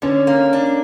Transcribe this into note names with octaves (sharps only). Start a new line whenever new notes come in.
D3 C#4
A#3
D4